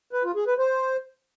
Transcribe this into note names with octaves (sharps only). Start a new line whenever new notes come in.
B4
F4
G#4
B4
C5